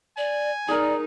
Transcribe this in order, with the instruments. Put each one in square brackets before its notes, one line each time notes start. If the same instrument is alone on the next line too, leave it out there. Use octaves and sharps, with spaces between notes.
[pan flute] D5 [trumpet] G#5
[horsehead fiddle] D#4 [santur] G#4 A#4 [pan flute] D5